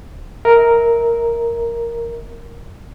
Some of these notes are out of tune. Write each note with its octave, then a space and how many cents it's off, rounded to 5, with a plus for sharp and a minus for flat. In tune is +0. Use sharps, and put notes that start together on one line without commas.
A#4 +0 E5 -30